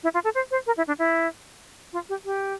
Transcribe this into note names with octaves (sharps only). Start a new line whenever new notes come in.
E4
F4
A4
C5
C5
A#4
E4
D4
E4
F4
G4
G4